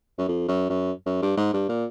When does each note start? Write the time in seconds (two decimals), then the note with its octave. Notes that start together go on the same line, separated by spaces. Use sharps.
0.18 F#2
0.28 F2
0.48 F#2
0.69 F#2
1.06 F#2
1.22 G2
1.37 G#2
1.53 G2
1.69 A#2